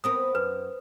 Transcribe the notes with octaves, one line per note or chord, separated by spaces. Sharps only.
B3 C4 A#4 D#6
F#2 B4